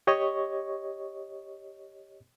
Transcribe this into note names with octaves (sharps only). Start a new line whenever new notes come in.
G4 C#5 D#5 C#6